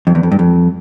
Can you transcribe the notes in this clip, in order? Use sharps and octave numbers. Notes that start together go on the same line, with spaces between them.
F2
E2
F2
G2
F2